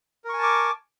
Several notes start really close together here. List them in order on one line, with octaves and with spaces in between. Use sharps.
A#4 C#6 G#5 A5 D6